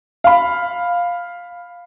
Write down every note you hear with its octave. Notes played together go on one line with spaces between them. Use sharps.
F5 B5